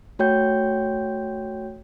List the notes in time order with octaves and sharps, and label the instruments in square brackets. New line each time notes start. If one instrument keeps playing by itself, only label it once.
[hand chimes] A3 F#4 C#5 G5 G6